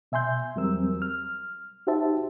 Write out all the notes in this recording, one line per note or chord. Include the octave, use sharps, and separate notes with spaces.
B2 E5 G#5 C6 G6
E2 F#3 G3 C4 A#4 E6
F6
D#4 F#4 G4 C5 E5 A5